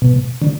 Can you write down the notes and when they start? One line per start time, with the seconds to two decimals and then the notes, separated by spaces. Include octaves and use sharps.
0.02 B2
0.42 D3